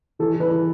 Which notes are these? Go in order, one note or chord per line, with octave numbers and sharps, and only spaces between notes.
E3 A4
E3 B4
E3